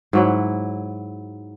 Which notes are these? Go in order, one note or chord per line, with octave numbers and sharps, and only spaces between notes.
G#2 F#3 E4